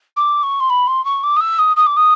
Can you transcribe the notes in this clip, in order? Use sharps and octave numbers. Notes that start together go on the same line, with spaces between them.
D6
C#6
C6
B5
C6
C#6
D6
D#6
E6
D#6
D#6
D6
D#6